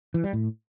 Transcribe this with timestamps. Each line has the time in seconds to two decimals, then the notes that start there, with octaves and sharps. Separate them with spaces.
0.14 E3
0.24 G3
0.33 A2